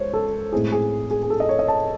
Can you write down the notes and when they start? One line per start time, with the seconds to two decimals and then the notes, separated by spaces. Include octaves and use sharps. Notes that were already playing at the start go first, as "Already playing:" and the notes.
Already playing: C#2 C5 C#5
0.13 A4
0.52 A2 G#3 C4 E4 G#4
0.72 G#4
1.11 G#4
1.23 G#4
1.30 A4
1.40 D#5
1.49 C#5
1.59 D#5
1.68 A5